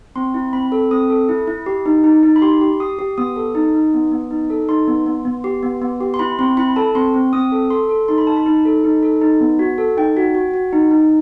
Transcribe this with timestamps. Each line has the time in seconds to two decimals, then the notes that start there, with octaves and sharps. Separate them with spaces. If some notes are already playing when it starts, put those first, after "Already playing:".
0.16 C4 C6
0.34 E4
0.53 C4 B5
0.72 A4
0.91 C4 D#6
1.10 A4
1.29 E4
1.47 E4
1.66 G4
1.86 D#4
2.04 D#4
2.23 D#4
2.36 B5
2.42 G4 C6
2.61 G4
2.80 G4 D#6
2.99 G4
3.18 B3 D#6
3.36 A4
3.55 D#4
3.74 D#4
3.94 B3
4.12 B3
4.31 D#4
4.50 A4
4.69 D#4 C6
4.88 B3
5.06 B3
5.25 B3
5.44 G4
5.63 B3
5.82 B3
6.01 G4
6.14 C6
6.19 E4 B5
6.39 C4 C6
6.57 E4 B5
6.76 A4 A5
6.95 C4 C6
7.14 C4
7.33 C4 D#6
7.52 A4
7.70 A4 C6
7.89 A4
8.08 D#4 C6
8.18 B5
8.27 D#4 A5
8.37 B5
8.46 D#4
8.65 A4
8.84 D#4
9.03 A4
9.22 D#4
9.41 B3
9.59 F#4
9.78 A4
9.97 D#4 G5
10.17 F#4
10.35 F#4
10.54 F#4
10.73 D#4
10.91 D#4